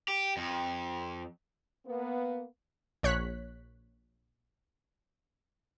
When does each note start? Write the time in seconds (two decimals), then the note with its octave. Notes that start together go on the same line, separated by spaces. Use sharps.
0.08 G4
0.37 F2
1.86 A#3 B3
3.03 A#1 C#5 F#6 B6